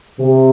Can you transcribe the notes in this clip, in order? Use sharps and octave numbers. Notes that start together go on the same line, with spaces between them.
C3